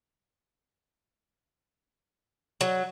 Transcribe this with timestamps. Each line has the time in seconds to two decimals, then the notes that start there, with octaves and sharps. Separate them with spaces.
2.61 F#3